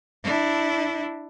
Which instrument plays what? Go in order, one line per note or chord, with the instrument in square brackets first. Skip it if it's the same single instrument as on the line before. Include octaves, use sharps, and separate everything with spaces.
[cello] D4 E4